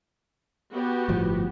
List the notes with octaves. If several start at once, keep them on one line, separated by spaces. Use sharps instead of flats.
B3 F#4 G4
G1 A2 F3